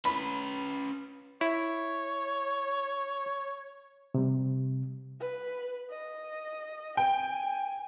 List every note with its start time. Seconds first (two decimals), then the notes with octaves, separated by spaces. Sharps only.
0.05 C#4 B4 B5
1.41 E4 C#5
4.14 C3 G3
5.20 B4
5.90 D#5
6.97 G5 G#5